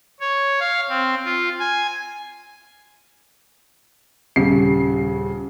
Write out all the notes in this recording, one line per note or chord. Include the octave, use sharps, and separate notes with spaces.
C#5
F5
C4
F4
G#5
D#1 C#3 C7